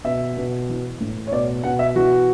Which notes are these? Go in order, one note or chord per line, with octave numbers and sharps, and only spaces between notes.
B2 E5
B2
E3
A2
C#5
B2 D5
B2 F#5
E5
E3 F#4